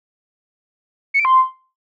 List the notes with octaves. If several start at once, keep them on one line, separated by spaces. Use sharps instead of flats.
C#7
D7
C6